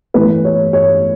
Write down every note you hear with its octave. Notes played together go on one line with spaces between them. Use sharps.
A2 E3 B4
C#5
C#5